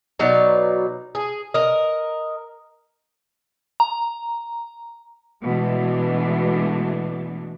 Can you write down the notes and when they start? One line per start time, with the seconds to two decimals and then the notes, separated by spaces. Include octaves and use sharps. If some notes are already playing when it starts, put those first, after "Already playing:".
0.19 B2 F#3 D#4 D5
1.15 G#4
1.54 A#4 D#5
3.80 A#5
5.43 B2 E3 G#3 A3 D4